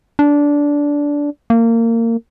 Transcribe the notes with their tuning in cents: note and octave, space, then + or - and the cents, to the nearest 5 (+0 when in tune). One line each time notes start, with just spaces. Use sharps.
D4 -15
A#3 -25